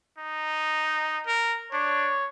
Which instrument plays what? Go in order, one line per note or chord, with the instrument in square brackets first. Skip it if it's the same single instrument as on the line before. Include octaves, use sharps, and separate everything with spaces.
[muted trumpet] D#4
A#4
[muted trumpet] D4 [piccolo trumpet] C#5